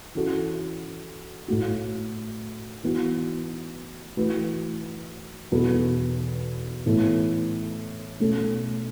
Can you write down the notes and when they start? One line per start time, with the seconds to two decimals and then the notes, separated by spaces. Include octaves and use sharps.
0.15 E3 C#4 F#4 A4
1.48 A2 A3 F#4
2.84 E3 B3 F#4
4.17 E3 A3 F#4 B4
5.52 E2 B2 B3 F#4 A4
6.86 A2 E3 B3 A4
8.20 B2 A3 C#4 A4